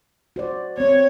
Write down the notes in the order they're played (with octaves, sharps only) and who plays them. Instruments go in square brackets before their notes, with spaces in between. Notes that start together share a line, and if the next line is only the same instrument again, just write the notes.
[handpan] F#4 C5 D5
[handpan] B3 C4 [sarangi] C#5